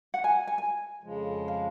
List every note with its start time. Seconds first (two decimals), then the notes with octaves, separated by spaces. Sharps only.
0.14 F#5
0.24 G#5
0.47 G#5
0.58 G#5
1.03 F2 C#3 F3 G#3
1.48 F5